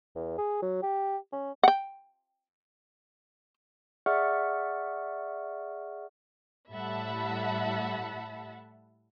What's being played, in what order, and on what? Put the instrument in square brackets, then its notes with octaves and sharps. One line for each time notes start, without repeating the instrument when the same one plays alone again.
[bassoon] E2
G#4
F#3
G4
C#4
[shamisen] F#5 G5
[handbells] G#4 D5 E5 F#5 C#6 F6
[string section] A2 G3 E5 F#5 A5 B5